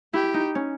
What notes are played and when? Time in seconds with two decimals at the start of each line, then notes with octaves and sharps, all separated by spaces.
0.13 E4 G4
0.34 D#4
0.55 C#4